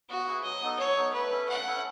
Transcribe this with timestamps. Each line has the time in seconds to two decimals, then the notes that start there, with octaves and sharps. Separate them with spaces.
0.09 B3 F#4
0.27 E4 G#4 B4
0.44 F#3 D#5
0.61 B3 D#4 A4
0.79 F#3 C#5
0.97 B3 D#4 A4
1.13 A3 B4
1.32 C#4 E4 A4
1.48 A3 F#5
1.66 C#4 E4 A4